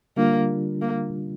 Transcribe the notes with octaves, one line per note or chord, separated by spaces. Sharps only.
D3 G3 A#3 D4 F4
A#3